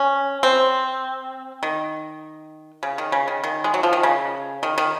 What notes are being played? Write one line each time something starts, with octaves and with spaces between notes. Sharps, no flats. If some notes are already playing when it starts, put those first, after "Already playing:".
Already playing: C#4
C4
D#3
C#3
D#3
C#3
D#3
D#3
G#3
F#3
F3
D#3
C#3
D#3
D#3